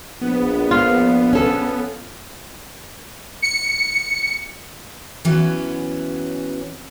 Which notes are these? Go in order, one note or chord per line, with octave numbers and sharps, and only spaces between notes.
A#1 B3
F4
C#4 A4
C#7
E3 F#3 B3 C#4